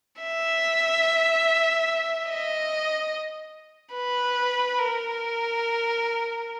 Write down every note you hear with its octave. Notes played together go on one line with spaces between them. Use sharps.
E5
D#5
B4
A#4